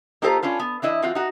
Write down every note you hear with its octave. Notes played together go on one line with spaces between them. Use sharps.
A#3 D#4 F4 G4 A4 C5
C#4 D4 F4 B4
B3
E3 D4 E4 D#5
E3 C4 F4 F#4
D#4 F#4